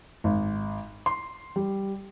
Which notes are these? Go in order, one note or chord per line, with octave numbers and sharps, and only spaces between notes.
G#1
C6
G3